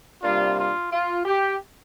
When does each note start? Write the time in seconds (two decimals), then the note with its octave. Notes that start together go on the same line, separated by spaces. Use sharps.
0.23 C3 G3 A#3 D4 F4
0.57 F4
0.91 F4
1.25 G4